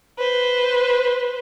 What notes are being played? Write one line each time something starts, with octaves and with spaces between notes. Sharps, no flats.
B4 C5